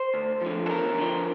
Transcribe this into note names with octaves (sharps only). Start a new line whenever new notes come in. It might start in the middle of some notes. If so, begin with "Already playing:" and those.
Already playing: C5
D2
D3 F3
A4
E2 A#4
D3 F3